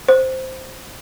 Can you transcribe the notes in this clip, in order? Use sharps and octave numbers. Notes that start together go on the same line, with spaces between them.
C5